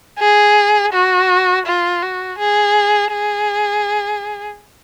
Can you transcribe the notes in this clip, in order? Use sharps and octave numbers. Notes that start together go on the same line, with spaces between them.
G#4
F#4
F4
F#4
G#4
G#4